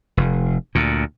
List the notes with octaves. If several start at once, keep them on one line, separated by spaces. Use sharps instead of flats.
F1
D2 A#2